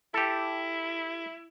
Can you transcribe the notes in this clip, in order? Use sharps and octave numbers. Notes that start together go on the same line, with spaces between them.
E4 G4 A4